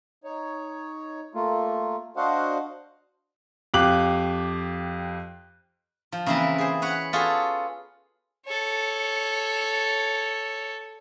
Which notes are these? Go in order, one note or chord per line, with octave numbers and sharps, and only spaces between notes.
D#4 C#5
A3 A#3 F4
D4 F#4 C5 D#5 F5 F#5
F2 G4 F5 D6 F#6 F#7
F3
C#3 E3 A#3 C4 E4 B4
G#4 C5
B4 C#5 F#5
B3 F4 F#4 G#4 A4
A4 C#5